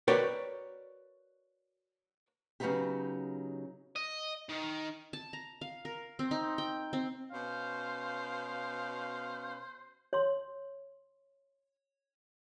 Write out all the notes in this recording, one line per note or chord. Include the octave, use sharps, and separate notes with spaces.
F#4 A#4 B4 C#5 D5 G5
C#3 F#3 B3 C4 D#4 G4
D#5
D#3
A5
A#5
F5
A#4
C4
D#4
G5
C4
B2 C#4 C5 F5
C#5 C6